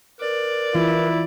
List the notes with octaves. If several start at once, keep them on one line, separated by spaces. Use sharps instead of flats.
A#4 B4 D5
E3 E4 F4